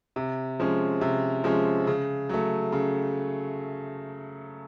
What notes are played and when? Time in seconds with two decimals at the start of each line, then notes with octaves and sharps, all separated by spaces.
0.16 C3
0.60 F3 G#3 C#4
1.01 C3
1.44 F3 G#3 C#4
1.87 C#3
2.29 F#3 A3
2.72 C#3